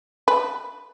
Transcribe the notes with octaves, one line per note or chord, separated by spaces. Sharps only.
B4